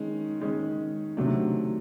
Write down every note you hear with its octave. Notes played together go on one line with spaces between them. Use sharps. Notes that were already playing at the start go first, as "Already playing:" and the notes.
Already playing: D#3 G#3 C#4
D#3 G#3 C#4
C3 D#3 F#3 A3 D4